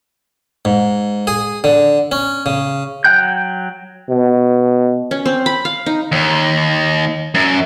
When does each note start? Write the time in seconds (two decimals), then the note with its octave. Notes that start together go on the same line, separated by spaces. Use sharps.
0.65 G#2
1.27 G#4
1.64 D3
2.12 C#4
2.46 C#3
3.04 F#3 F#5 G5 F#6 G6
4.10 B2
5.11 C#4
5.26 C4
5.46 B5
5.65 F5
5.86 D#4
6.12 D#2
7.35 F#2